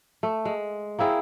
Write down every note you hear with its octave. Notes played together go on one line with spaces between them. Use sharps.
A3
G#3
A#3 C4 E4 G#4